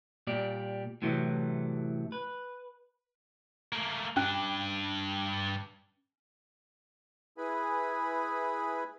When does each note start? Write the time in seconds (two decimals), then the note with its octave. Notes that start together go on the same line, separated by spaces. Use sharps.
0.27 A#2 G3 G4 D5
1.02 A2 C3 E3 F#3 A3
2.12 B4
3.73 A3 A#3
4.17 G2 C#4 D4
7.38 E4 G#4 B4 G#5 B5